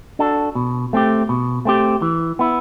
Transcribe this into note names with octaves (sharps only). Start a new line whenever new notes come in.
D4 F#4 A4
B2
A3 C4 G4
B2
A3 C4 G4
E3
B3 E4